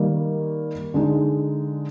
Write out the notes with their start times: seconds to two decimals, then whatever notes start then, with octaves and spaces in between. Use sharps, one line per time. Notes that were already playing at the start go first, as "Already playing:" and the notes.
Already playing: D#3 G3 A#3
0.94 D3 G#3 D#4